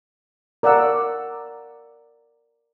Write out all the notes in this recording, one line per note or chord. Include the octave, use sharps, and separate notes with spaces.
A#4 D5 F5 F#5 E6